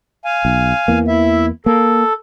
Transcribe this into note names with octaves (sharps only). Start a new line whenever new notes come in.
F5 G#5
B1
E2 E3 A#3
E4 E5
A#3 A4